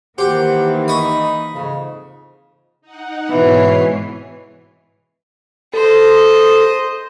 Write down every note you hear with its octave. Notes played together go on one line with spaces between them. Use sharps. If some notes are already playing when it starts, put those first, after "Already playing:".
D#3 E3 A#3 G4 C5 F#5
D#4 B5 C#6 D#6
F2 G#2 C#3
D#4 F#5
G#2 B2 E3 C#5 C7
A4 C5 D#5